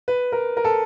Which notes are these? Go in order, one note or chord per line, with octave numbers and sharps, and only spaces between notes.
B4
A#4
A#4
A4